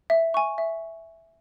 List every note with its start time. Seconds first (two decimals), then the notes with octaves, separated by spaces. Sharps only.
0.10 E5
0.34 G#5 C#6
0.58 E5